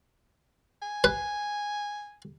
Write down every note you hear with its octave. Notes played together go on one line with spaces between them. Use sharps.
G#5
B4